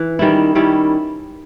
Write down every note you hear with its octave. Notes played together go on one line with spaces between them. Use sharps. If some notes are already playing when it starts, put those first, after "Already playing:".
Already playing: E3
D#3 G3 C#4 E4
D#3 G3 C#4 E4